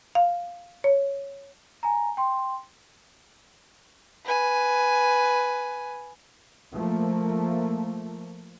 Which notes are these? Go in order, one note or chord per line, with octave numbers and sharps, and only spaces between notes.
F5
C#5
G#5 A#5
G5 C6
B4 G#5
F3 A3 A#3